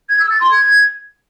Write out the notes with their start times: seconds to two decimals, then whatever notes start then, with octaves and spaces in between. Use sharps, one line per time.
0.09 G#6
0.19 E6
0.30 A6
0.40 C6
0.51 G#6